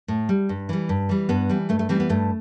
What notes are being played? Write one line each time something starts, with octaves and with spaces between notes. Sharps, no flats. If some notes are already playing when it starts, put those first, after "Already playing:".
A2
G3
G2
E3 G3
G2
E3 G3
G2 B3
E3 G3
G2 A3
A3
E3 G3 C4
B3
G2 A3